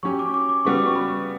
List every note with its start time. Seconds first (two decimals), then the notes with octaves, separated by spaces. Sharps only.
0.03 F#3 C#4 G4 C#6
0.19 D6
0.34 D6
0.49 D6
0.65 C#3 G3 B3 F#4 C#6
0.75 D6
0.86 C#6
0.96 B5